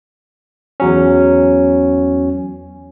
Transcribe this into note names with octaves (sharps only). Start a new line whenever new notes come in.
E2 F#3 C#4